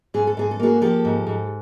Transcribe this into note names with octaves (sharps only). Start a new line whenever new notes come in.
G#2 G#4
A4
G#2 G#4
A4
A#3 F#4 G#4
F3 G4 A4
G#2
G#2